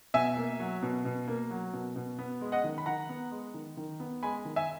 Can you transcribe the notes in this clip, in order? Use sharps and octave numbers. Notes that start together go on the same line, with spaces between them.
B2 E5 G#5
A#3
F#3
B2
B2
A#3
F#3
B2
B2
B3
G#3
D#5 F#5
D#3
B5
D#3 F#5 A#5
B3
G#3
D#3
D#3
B3
G#3 G#5 B5
D#3
E5 G#5